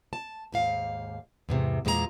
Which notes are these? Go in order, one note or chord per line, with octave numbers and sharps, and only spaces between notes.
A5
D#2 G#2 F5
E2 G#2 C3
E2 A#2 G#3 F#4 A#5